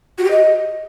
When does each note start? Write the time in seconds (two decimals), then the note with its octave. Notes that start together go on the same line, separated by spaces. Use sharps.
0.18 F#4
0.25 G4
0.31 D#5